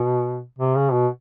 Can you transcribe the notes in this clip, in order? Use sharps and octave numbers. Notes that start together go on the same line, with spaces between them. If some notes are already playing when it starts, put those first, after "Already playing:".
Already playing: B2
C3
C#3
B2